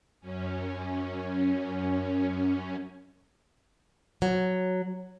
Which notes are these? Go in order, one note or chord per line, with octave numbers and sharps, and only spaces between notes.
F#2 C#4
F#3